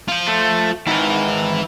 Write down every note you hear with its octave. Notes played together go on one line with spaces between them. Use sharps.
F4 C5
A3
G#2 D#3 E4 B4